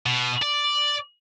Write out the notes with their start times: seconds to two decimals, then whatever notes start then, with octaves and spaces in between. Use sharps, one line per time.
0.06 B2
0.42 D5